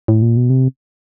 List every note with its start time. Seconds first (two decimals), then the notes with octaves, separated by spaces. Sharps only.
0.08 A2
0.22 A#2
0.37 B2
0.50 C3